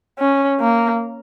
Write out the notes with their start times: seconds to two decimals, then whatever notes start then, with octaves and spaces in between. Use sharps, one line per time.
0.19 C#4
0.61 A#3